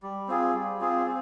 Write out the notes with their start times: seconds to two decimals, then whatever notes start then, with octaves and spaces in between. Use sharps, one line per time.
0.03 G3
0.28 C4 F4 G#4
0.54 G3
0.81 C4 F4 G#4
1.06 C4